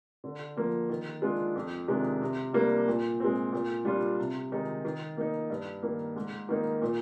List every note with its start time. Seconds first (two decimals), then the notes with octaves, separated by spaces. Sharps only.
0.24 D3
0.57 F3 A#3
0.89 D#3
1.22 G#3 D4 F4
1.55 F2
1.88 C3 D#3 G#3 D4
2.22 C3
2.53 G3 A#3 D4
2.88 A#2
3.20 G#3 C4
3.52 A#2
3.85 G3 D4 F4
4.19 C3
4.52 D#3 G#3 D#4
4.85 D#3
5.17 A#3 D#4
5.50 G2
5.83 D#3 A#3
6.16 G#2
6.49 D#3 A#3 D#4
6.82 A#2